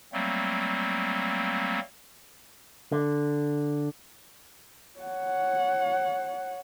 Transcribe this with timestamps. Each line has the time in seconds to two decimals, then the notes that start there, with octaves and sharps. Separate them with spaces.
0.13 F#3 G3 A3 A#3 C4
2.92 D3
5.00 C#5 F#5